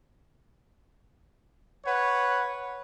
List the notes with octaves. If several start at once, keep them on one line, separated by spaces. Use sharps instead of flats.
B4 C#5 F#5